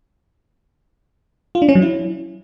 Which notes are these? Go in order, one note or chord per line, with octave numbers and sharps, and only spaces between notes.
F4
D4
C#4
F#3
E4